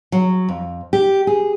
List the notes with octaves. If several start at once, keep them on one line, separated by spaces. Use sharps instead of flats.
F#3
F2
G4
G#4